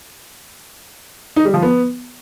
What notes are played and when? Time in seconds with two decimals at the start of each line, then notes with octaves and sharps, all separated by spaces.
1.36 D#4
1.45 G3
1.54 F3
1.62 B3